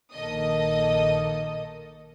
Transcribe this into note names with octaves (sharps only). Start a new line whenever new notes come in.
A#1 D#3 A#3 A4 D#5 D#6